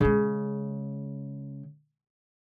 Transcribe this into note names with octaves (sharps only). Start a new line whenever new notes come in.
C#3 G#3